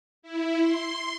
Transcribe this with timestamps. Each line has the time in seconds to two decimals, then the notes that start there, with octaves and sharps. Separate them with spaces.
0.22 E4
0.61 C6